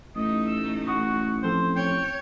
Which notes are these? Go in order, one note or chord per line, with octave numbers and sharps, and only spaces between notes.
A1 A3 D#4 D#5
E6
F#4 F#5 C#6 D#6
F3 C4 A4 C5
C#5 G5